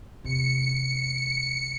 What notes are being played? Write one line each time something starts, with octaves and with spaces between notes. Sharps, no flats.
E2 C3 C#7